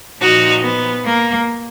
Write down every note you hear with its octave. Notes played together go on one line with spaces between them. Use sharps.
A#2 F3 D#4 F#4
B3
A#3